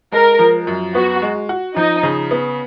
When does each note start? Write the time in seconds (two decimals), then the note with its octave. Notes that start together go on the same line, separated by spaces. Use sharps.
0.12 G#3 A#4
0.39 F3
0.67 F#2
0.94 B3 F#4
1.22 G#3
1.49 F#4
1.76 F3 D#4
2.03 C#3
2.31 B3